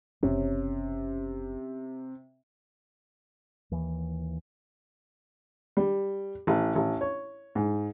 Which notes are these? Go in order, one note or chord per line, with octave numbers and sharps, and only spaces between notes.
F#1 C3 C#4
D#2 E3
G3
A1
A1
C#5
G#2